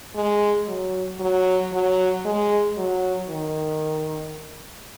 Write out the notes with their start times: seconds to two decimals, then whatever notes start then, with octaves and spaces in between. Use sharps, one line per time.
0.15 G#3
0.68 F#3
1.20 F#3
1.73 F#3
2.25 G#3
2.77 F#3
3.30 D#3